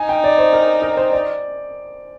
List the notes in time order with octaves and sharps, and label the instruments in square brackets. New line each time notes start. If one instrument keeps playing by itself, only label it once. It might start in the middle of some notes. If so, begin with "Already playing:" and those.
Already playing: [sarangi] D#4 [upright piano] G#5
[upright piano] G5
D5
C5
A#4
A#4
C5
D5